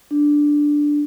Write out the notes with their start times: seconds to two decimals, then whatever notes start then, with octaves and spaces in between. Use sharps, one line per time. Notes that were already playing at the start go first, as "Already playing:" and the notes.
0.11 D4